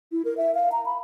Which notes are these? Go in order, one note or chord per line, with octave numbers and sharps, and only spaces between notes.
E4
A#4
E5
F5
A#5
B5